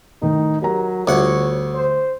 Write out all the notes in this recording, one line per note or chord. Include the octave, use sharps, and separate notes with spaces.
A2 D#3 D#4
F#3 G4 A#4 A#5
D2 G3 F4 C#5 F#5
C5